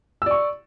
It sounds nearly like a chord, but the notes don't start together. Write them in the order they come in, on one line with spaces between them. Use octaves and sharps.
E6 D5 C#6